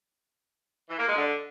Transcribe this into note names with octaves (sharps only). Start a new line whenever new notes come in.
E3
A#3
G#3
D3